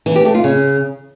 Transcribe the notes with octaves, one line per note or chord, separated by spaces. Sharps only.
E3
G4
A3
F4
C#3